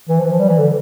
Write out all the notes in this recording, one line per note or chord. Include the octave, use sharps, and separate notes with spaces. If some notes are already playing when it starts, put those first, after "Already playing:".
E3
F3
E3
F3
G3
E3
D3